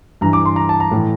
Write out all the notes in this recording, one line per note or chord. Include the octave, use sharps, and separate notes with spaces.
G2 E3 A#5
D6
C6
A#5
A5
A#5
A2 E3